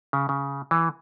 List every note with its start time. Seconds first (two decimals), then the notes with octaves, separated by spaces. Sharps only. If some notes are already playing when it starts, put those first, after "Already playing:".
0.13 C#3
0.29 C#3
0.71 E3